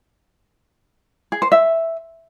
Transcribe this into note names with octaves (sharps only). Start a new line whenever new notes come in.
G#4
C5
E5